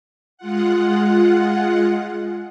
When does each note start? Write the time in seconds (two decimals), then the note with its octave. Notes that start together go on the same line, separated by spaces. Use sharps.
0.37 G#3 F4 F#5